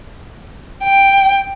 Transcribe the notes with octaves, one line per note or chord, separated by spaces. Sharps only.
G5